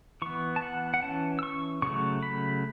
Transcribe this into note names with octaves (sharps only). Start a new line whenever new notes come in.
E3 B3 C#6
A5
F#5
F#5
E3 C#4 A5
E6
C#6
C#3 F#3 A3 C#6
B5